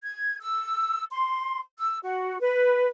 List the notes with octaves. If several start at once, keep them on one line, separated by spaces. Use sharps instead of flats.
G#6
E6
C6
E6
F#4
B4